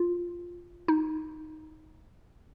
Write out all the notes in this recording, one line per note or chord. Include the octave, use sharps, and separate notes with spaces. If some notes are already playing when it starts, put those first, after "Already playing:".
Already playing: F4
D#4